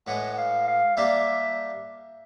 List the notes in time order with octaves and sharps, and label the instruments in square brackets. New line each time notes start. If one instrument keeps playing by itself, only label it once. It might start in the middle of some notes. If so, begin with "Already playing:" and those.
[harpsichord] A2 E3 G#3 [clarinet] F#5
[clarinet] F#5
F5
F5
[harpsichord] G3 A#3 D4 G4 [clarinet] E5